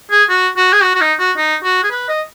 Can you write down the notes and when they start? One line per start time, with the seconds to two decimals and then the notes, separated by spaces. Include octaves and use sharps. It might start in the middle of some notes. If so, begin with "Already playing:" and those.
0.11 G#4
0.29 F#4
0.57 F#4
0.73 G#4
0.82 F#4
0.95 F#4
1.01 D#4
1.19 F#4
1.37 D#4
1.64 F#4
1.84 G#4
1.91 B4
2.09 D#5